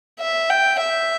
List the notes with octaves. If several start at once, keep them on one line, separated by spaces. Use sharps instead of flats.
E5
G5
E5